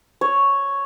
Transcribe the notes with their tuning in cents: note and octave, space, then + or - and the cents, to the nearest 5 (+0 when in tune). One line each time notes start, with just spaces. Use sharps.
C#5 +0